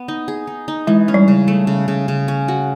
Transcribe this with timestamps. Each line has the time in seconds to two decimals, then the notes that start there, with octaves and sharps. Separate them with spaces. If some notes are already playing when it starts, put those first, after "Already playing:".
Already playing: B3
0.08 D#4
0.28 G#4
0.47 D#4
0.68 D#4
0.87 E3 G#3
1.08 C#4
1.14 G3
1.28 C#3
1.48 A3
1.67 C#3
1.88 C#3
2.08 C#3
2.28 C#4
2.48 F#4